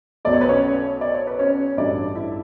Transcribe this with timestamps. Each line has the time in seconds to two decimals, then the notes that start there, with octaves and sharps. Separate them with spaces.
0.25 B1 B2 F#3 A3 D5
0.33 C#5
0.41 B4
0.49 C#4 C#5
1.01 D5
1.14 C#5
1.27 B4
1.39 C#4 C#5
1.77 A1 G2 F#3 A3 D4 D5
2.15 E4 E5